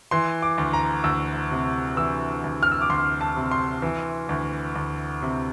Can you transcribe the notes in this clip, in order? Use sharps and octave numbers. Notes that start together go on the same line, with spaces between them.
E3 C6
D6
D2
A#5
D2 E6
C3
E3 E6
D2
F6
E6
D6
D2 C6
A5
C3
C6
E3
D2
D2
C3